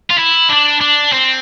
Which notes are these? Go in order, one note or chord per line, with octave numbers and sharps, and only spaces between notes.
F4
E4
D4
D4
C4